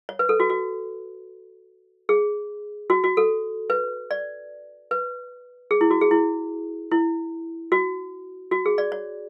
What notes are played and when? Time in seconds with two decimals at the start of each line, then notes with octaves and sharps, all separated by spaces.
0.09 C#5
0.19 B4
0.29 A4
0.40 F#4
0.50 F#4
2.09 G#4
2.90 F#4
3.04 F#4
3.17 A4
3.70 B4
4.11 D5
4.91 B4
5.71 G#4
5.81 E4
5.90 F#4
6.01 G#4
6.11 E4
6.91 E4
7.72 F#4
8.51 F#4
8.66 G#4
8.78 D5
8.92 C#5